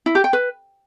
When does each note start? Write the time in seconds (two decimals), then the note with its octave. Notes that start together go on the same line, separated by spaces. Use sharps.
0.06 E4
0.15 G4
0.24 G5
0.33 B4